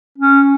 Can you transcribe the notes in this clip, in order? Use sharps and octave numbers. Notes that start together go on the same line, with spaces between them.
C#4